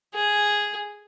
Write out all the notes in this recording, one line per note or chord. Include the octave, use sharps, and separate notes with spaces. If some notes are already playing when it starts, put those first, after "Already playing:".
G#4